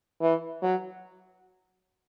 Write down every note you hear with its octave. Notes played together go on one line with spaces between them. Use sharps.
E3
F#3